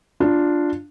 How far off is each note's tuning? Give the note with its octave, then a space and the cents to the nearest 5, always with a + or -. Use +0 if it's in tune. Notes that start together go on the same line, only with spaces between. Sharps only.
D4 +0 F4 +0